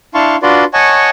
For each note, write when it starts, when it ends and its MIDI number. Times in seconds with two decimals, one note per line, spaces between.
0.14 0.36 62
0.14 0.36 64
0.14 0.36 77
0.14 0.36 81
0.14 0.36 84
0.14 0.36 85
0.43 0.64 62
0.43 0.64 65
0.43 0.64 66
0.43 0.64 71
0.43 0.64 74
0.43 0.64 84
0.74 1.10 73
0.74 1.10 75
0.74 1.10 78
0.74 1.10 80
0.74 1.10 81
0.74 1.10 85